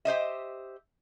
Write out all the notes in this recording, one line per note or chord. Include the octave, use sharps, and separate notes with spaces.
G4 C5 D#5 E5